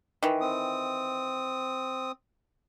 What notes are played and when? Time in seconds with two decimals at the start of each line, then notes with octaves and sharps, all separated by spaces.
0.23 D#3 E3
0.41 C4 D#6